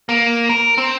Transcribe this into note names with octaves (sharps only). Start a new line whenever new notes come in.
A#3
A#4
C4